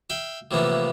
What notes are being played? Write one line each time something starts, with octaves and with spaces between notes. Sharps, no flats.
E5 F5 G5
A2 C3 E3 F3 A#3 B3